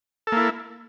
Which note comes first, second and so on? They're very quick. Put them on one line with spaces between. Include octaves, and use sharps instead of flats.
A4 A#3 E4